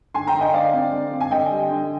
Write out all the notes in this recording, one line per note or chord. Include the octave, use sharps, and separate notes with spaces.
D3 G#5 C6
G5 A#5
D3
D#5 G5
D3 D5 F5
C4
D3
C4
G#5
D3 D#5 G5
G3
D3